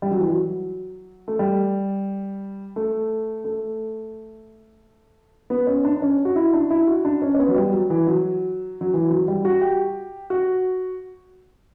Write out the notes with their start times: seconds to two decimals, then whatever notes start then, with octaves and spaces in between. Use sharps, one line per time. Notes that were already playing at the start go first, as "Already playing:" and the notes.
0.02 G3
0.11 F#3
0.20 E3
0.28 F#3
1.28 A3
1.39 G3
2.76 A3
3.44 A3
5.50 B3
5.67 C#4
5.85 D4
5.96 D4
6.02 C#4
6.25 F#4
6.36 E4
6.53 D4
6.70 E4
6.87 F#4
7.05 D4
7.22 C#4
7.35 C#4
7.39 B3
7.48 F#3
7.56 G3
7.73 F#3
7.90 E3
8.07 F#3
8.81 F#3
8.94 E3
9.11 F#3
9.28 G3
9.45 F#4
9.61 G4
10.30 F#4